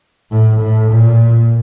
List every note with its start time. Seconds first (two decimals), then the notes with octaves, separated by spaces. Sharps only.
0.31 A2
0.61 A2
0.91 A#2